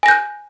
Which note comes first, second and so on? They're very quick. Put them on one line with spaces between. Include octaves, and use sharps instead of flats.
G#5 A#6 G6 F#6